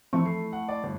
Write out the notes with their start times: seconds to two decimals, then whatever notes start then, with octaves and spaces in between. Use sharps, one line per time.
0.13 E3 F3 A3 C4 E4 C#6
0.25 A4 C7
0.53 F#5
0.68 D5
0.83 G1